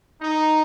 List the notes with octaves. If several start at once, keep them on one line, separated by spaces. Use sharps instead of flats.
D#4